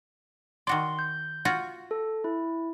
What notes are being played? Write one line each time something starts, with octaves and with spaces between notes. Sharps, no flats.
D#3 F#4 D5 C6
G6
F4 F#4
A4
E4